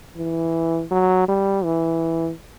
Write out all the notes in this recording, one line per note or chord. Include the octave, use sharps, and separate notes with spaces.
E3
F#3
G3
E3